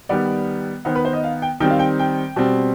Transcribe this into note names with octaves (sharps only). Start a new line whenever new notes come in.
D#3 G3 B3 D5
D#3 B3 C5
B4
C5
D#5
F5
G5
D#3 G3 C4 G5
F5
G5
G5
B2 G3 C4